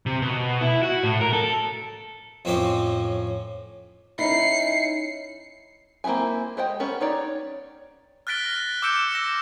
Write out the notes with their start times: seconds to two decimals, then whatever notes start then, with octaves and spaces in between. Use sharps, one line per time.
0.06 C3
0.22 B2
0.61 E4
0.83 F#4
1.03 A2
1.21 A#4
1.33 A4
2.45 F2 A2 C4 C#4 C6 D6
4.19 C#4 D#4 E4 C7 C#7
6.04 A#3 C4 D#4 E4 G#5
6.57 G#3 C5 D#5 G5
6.80 B3 C#4 A#4 B4
7.01 D#4 C#5 D5
8.27 F6 F#6 A6 B6 D7 G7
8.46 F#6 A#6
8.82 D6 E6 G6 C#7 D7 E7
9.15 E6 A#6